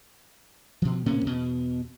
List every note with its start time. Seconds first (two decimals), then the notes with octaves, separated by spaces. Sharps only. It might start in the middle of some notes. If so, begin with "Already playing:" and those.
0.82 B2 F3
1.06 A2 C3 A#3 C#4
1.25 E2 B2